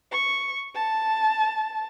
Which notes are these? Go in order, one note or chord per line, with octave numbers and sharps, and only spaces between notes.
C#6
A5